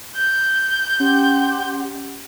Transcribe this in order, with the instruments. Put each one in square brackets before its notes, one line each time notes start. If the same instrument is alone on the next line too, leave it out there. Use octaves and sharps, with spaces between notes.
[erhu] G6
[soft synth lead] C#4 [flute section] G4 F#5 C6